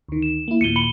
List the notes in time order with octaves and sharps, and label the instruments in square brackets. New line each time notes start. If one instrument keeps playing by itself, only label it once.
[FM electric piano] D2 D#3
[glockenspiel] E7
[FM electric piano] A#3 E4
[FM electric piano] D#2 A#2 [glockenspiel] C#7 D#7 G7
[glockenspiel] B5 C#7 G7